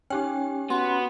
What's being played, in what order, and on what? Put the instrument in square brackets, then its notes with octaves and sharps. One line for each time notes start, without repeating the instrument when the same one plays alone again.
[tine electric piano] C#4 [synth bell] D#4 G4 G5
[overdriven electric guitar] B3 [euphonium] F#4 [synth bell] C6